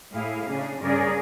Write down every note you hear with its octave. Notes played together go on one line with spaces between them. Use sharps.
A2 E4 G#4 F5
C#3 D4 G#4
G2 C#3 G#4 A#4 D5